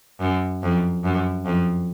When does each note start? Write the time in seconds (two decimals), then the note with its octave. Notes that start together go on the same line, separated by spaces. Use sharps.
0.20 F#2
0.63 F2
1.04 F#2
1.46 F2